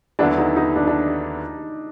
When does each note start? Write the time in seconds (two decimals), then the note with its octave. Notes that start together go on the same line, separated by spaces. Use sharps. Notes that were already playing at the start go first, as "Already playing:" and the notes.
0.19 D#2 D3 F#3 B3 D4 E4
0.38 D#4
0.56 D#4
0.76 D4
0.87 D4